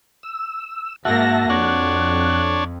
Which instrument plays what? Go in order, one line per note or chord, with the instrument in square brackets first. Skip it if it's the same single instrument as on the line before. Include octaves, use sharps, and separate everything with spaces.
[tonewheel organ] E6
[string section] G#2 A#3 A#6 [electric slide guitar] F#4 [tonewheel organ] E5 A5
[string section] F2 [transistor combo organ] D4 C#5 [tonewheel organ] F#6